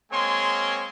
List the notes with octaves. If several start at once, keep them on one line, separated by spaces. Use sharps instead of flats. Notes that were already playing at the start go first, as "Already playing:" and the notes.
G#3 A#3 C4 C#5 G#5 C6